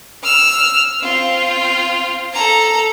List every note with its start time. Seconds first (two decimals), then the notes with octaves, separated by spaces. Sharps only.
0.24 E6 F6
1.03 C4 F4
2.33 A4 A#5